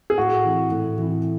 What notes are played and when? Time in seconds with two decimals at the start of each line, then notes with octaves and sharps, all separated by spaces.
0.10 G#4
0.18 A2 F#4
0.44 E3 C4 E4
0.71 A2
0.98 E3 C4 E4